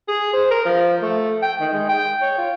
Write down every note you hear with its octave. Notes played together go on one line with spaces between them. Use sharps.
G#4
C5
A#4
F3
A3
G5
D#3
G#3
G5
C#5
F4